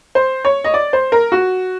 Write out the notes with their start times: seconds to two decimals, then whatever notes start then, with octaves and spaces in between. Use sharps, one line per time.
0.15 C5
0.45 C#5
0.64 D#5
0.74 D5
0.93 C5
1.12 A#4
1.32 F#4